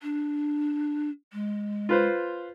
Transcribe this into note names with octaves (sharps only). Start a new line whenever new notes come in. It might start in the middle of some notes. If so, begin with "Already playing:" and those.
D4
G#3
F4 B4 C5